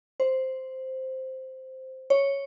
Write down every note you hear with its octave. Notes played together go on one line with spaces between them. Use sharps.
C5
C#5